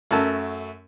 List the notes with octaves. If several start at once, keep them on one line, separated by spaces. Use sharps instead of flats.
F#2 A3 F#4 A#4 A5 E6